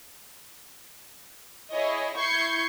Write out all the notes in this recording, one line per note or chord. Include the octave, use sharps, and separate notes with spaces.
E4 G#4 C#5 D#5
E4 C#6 G6 G#6 C7 C#7